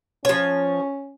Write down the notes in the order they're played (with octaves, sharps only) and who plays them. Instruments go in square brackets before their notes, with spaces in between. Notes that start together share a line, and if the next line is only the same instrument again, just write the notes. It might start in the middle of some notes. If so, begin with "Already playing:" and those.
[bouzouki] F3 C#5 [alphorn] C#4